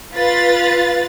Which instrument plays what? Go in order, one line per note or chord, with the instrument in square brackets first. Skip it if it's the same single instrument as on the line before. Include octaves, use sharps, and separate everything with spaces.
[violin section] F4 B4 A6